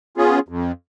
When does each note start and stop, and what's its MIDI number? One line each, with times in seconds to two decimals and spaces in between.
0.18 0.39 59
0.18 0.39 61
0.18 0.39 65
0.18 0.39 68
0.49 0.72 41